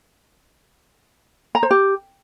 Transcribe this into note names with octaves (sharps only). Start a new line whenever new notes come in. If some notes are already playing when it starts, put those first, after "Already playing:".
A#5
C5
G4